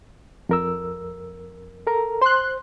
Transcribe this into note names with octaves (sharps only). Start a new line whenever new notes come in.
F2 A#4 E6
A4 A#4 A#5
C5 C6 F#6